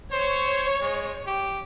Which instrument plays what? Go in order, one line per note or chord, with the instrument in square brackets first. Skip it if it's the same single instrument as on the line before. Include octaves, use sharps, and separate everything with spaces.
[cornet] C5 [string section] C#5
[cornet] G#3
G4